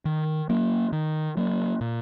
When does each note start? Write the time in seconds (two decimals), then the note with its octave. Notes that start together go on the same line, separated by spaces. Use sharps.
0.05 D#3
0.49 F#3 A#3
0.92 D#3
1.37 F#3 A#3
1.81 A#2